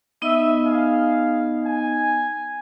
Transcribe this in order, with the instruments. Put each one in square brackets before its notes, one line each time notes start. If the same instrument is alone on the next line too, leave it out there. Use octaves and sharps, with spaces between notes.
[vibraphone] B3 D#4 D#5 [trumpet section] E5
[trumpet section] G#4 F5
G#5